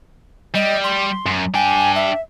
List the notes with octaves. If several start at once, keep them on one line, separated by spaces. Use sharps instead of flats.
G3 D#5
C6
F#2
D4 G5 G#5
E5